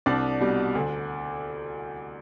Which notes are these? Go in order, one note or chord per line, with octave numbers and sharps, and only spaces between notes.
C2 D4 D5
B2 G3
D2